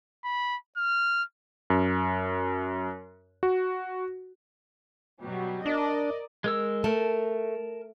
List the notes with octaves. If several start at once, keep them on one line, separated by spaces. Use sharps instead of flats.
B5
F6
F#2
F#4
B2 F#3 G3
D4 A#4 D5 D#5
G#3 A#4 E6
A3 A#4 A5